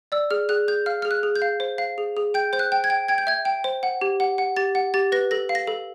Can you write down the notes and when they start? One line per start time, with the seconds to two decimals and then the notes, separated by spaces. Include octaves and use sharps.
0.12 D5 E6
0.31 G#4 F6
0.49 G#4 F#6
0.68 G#4 G6
0.86 F5 F6
1.02 G#4 F6
1.11 F#6
1.23 G#4
1.36 G6
1.42 F5
1.60 C5
1.78 F5
1.98 G#4
2.17 G#4
2.34 G5 G6
2.53 C5 G6
2.59 F#6
2.72 G5
2.84 G#6
2.90 G5
3.08 G5 G#6
3.18 G6
3.27 E5 G#6
3.45 G5
3.64 C5
3.83 F#5
4.01 G4
4.20 F#5
4.38 F#5
4.56 G4 A6
4.75 F#5
4.94 G4 A6
5.12 B4 A#6
5.31 A4 A#6
5.49 F5
5.55 A#6
5.67 A4